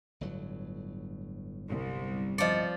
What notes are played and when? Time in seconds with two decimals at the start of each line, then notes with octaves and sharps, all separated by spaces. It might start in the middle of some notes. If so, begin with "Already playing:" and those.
0.21 G1 A2 F#3
1.69 C2
2.38 F3 D5 D#5 C#7